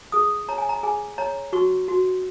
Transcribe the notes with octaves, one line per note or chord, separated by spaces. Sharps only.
G#4 D#6
C#5 A#5
G#5
A#5
G#4 G#5
C#5 A#5
F#4 C#6
F#4